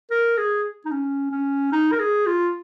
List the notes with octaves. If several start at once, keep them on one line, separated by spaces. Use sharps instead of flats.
A#4
G#4
D#4
C#4
C#4
D#4
A#4
G#4
F4